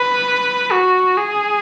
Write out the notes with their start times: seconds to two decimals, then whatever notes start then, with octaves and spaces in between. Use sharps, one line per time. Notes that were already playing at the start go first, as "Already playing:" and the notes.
Already playing: B4
0.72 F#4
1.17 G#4